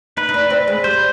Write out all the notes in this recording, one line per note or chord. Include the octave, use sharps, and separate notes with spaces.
D#4 B4
D#4
D4
C4
G#3
G3 C5